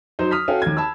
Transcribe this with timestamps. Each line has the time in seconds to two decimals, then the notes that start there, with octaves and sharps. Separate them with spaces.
0.19 F#3 D#4 C5
0.31 D#6 F6 B6
0.48 C#4 F#4 A4 F5 G5
0.62 D#2 G#6
0.77 A5 B5 E6